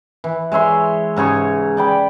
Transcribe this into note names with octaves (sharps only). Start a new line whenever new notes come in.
E3
G#3 C#5 E5 C6
G#2 C#3 G#4 C#6
D5 G5 B5